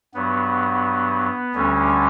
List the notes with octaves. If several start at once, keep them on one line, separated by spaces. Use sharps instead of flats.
G2 F#3 B3
D2 D3 G3 C#4